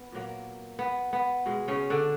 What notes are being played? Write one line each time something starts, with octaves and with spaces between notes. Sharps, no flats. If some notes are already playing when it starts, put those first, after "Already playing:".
Already playing: B3
A#2 F#3 A#3
B3
B3
B2 G#3
C#3 C#4
D3 D4